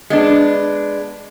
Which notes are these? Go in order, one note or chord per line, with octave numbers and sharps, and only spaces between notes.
G#3 B3 D4